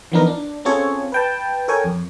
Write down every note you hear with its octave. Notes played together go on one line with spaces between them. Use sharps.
E3 F3 B3 D4 D#4 A#4
D4
C4 C#4 F4 G#4 A4 C#5
B4 G5 A5
A4 A#4 C#5 G5 G#5
F2